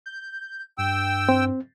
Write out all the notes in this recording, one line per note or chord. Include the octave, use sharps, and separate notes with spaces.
G6
G2 G5 E6
C4